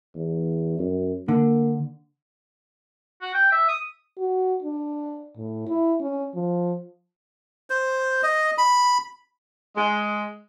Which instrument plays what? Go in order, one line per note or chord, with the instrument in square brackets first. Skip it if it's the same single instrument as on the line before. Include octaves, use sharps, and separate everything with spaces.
[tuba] E2
F#2
[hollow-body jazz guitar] D3 [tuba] A#3
[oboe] F#4
G5
E5
D#6
[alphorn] F#4
D4
A2
E4
C#4
F3
[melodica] C5
D#5
B5
[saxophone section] G#3